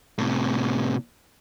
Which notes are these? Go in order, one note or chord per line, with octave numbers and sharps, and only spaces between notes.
A2 C3